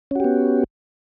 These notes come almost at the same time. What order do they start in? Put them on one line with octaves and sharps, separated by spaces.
C#4 F#4 G4 B3